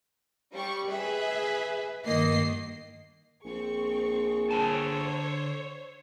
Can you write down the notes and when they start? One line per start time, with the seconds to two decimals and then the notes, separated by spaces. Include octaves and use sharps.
0.53 G3 C#6
0.89 G#4 B4 E5
2.05 G2 D#3 A#3 D#5 C7
3.44 A#1 C4 G#4 C#6
4.51 D3 C5 C#5 G5 A5